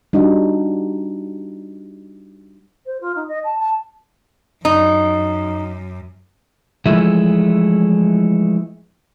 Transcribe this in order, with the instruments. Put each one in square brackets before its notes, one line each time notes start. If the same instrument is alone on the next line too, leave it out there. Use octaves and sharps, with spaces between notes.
[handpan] G3 D4 D#4 F#4
[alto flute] C5
F4
D#4
D#5
A5
A5
[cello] F#2 [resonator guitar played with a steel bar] D#4
[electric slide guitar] E3 F3 G#3 A3 E4